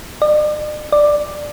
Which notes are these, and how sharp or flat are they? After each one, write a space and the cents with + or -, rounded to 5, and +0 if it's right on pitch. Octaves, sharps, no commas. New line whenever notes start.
D5 +45
D5 +10